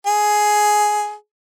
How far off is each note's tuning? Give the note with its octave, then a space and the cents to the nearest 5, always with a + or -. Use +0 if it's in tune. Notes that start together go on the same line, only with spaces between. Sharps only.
G#4 +10